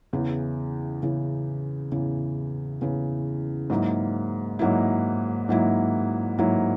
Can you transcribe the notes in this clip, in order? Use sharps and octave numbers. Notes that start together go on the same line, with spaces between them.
E2 C#3 E3
E2 C#3 E3
E2 C#3 E3
E2 C#3 E3
G#2 F#3 A#3 E4
G#2 F#3 A#3 E4
G#2 F#3 A#3 E4
G#2 F#3 A#3 E4